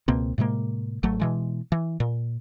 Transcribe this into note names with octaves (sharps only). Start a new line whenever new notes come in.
C#2 B2 A#3 C4
A2 C3 G#3 A#3
G#1 F#3 A3
B2 E3 G#3
E3
A#2